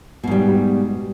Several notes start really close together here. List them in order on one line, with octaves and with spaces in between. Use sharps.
B2 G#2 G3